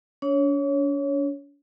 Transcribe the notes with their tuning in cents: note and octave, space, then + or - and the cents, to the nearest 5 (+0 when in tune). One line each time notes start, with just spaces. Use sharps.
D4 -45 C#5 +0